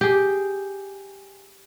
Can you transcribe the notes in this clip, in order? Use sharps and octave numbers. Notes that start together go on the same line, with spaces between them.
G4 G#4